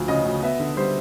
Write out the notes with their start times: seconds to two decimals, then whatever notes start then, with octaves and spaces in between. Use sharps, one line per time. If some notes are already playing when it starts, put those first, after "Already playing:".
Already playing: D2 F3
0.08 C#3 D#5
0.25 D2
0.42 B3 E5
0.60 D3
0.77 G3 C5